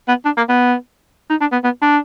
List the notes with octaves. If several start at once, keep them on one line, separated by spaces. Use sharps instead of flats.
B3
D4
A#3
B3
D#4
D4
B3
B3
D4